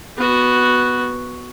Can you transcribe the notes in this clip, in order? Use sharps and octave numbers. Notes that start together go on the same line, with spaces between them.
B3 F#4